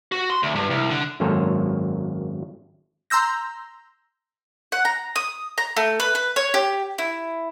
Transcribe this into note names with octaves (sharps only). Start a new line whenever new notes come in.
F#4
C6
D2
G2
C2
D3
G#1 F#2 A#3 A4 C5 C#5
A#5 C6 E6 G6 A#6
F#5
A#5
D#6
A#5
A3
B4
B4
C#5
G4
E4